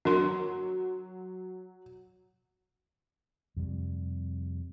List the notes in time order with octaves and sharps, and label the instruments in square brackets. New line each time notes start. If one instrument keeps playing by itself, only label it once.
[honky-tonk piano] F#3 [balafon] D4 A#4 C6
[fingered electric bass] F2 C3 G3